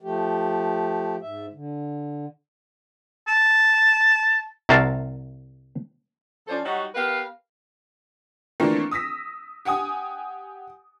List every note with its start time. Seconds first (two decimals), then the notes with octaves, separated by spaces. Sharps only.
0.01 F3 A3 G4
1.22 G#2 E5
1.54 D3
3.28 A5
4.69 C2 C3 F#4 A#4 F5 A5
6.48 F3 C#4 F4 A4 C5 D5
6.64 F#3 G3 D#4 F#4
6.95 B3 G4 A#4 B4 F5
8.60 E3 A3 A#3 C4 D4 F4
8.91 D#6 E6 A#6 B6
9.65 G4 F#5 G#5 D#6